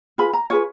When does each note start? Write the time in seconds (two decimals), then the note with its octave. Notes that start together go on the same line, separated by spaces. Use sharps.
0.18 F4 G#4 B4 B5
0.33 A#5
0.50 F4 G#4 B4 C#5